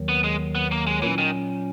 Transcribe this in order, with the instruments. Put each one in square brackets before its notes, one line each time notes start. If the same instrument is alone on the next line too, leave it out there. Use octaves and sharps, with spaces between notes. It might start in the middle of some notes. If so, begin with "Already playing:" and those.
Already playing: [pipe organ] D#2 D#3 F#3
[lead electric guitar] B3
G#3
B3
A#3
G#3
[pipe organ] A#2 F#3 C#4 [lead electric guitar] E3
[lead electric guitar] D#3